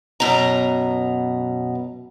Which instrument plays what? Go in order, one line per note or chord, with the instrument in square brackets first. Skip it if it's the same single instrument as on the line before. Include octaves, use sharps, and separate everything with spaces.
[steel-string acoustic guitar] F#2 B2 A#5